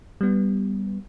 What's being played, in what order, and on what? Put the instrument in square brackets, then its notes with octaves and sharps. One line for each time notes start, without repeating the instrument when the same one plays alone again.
[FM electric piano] G3 B3